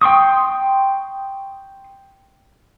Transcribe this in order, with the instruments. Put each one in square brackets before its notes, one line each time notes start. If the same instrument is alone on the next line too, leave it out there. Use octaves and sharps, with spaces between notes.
[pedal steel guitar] G5 C6 C#6 D#6